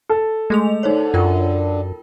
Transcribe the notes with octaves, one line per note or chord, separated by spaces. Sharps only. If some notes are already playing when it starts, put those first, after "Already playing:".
A4
G#3 A3 G#4 F7
D3 D#4 C5 C#5
F#2 F4 A#4 G5